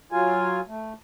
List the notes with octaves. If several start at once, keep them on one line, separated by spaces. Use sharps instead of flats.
F#3 F4 G#5
A3